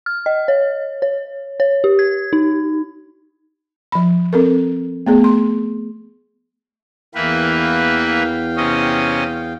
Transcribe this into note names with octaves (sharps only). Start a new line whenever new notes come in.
F6
D#5
C#5
C#5
C#5
G4
G#6
D#4
F3 B5
C4 A4 A#4
A3 B3 G#4
C6
E2 E3 A#3 B4 F5 G5
C3 C#4 D#5